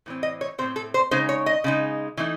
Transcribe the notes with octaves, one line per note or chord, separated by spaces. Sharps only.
A2 E3 C4
D#5
C#5
A2 E3 C4 C5
A4
C5
C#3 G#3 D#4 C5
C#5
D#5
C#3 G#3 D#4
E3 A3 D#4